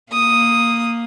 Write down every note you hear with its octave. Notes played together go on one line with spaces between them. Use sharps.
A#3 D#6